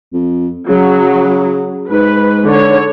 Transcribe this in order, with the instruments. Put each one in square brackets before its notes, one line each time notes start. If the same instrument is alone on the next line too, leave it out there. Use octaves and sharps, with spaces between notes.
[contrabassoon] F2
[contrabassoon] C#3 [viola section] F#3
[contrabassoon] G#2 [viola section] B4
[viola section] D3 C#5